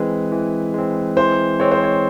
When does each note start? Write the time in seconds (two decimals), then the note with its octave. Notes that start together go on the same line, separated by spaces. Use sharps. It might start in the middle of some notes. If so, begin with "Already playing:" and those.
Already playing: E3 G#3 C4 B4
0.31 E3
0.74 G#3 C4
1.17 E3 C5
1.59 G#3 C4 C#5
1.71 C5
1.84 C#5